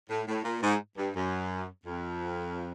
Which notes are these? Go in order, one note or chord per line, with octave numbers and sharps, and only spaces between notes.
A2
A2
A#2
G#2
G2
F#2
F2